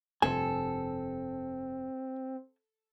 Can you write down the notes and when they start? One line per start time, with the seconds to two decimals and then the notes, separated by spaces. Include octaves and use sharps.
0.22 F1 G2 C4 A4 G#5